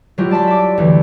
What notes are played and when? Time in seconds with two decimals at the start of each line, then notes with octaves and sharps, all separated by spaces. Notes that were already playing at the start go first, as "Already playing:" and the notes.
0.18 F#3 G#3 E4 F4 G4
0.31 D5 A5 C6 B6
0.47 E5 D6
0.78 D2 E3